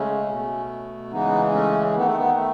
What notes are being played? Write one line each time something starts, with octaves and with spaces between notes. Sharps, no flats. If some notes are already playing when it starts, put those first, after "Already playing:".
Already playing: C#3 G#3 A3 C#4
B2 A3
C#3 E3 G#3 B3 D#4
A3 C#4
D#3 A3 B3
A3
B3
A3